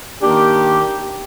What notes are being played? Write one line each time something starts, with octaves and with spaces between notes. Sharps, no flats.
D#3 A#3 D4 G4